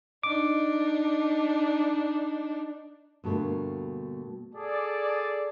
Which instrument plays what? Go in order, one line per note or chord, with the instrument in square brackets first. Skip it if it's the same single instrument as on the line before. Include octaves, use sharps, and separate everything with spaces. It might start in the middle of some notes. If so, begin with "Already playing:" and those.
[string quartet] D4 D#4 [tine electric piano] D6
[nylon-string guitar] G2 B2 D3 F#3 A3 A#3
[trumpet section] G#4 A4 D5